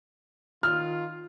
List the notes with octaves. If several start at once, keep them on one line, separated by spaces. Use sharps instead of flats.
D#3 F4 F6